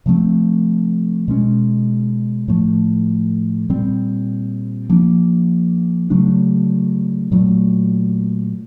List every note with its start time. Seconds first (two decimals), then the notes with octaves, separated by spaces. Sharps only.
0.06 C3 F3 A3 C4
1.28 B2 G#3 C#4
2.48 A2 F3 A3
3.69 A#2 G3 C4
4.90 F3 A#3 D4
6.10 C#3 F#3 A3 D4
7.32 A#2 F#3 A3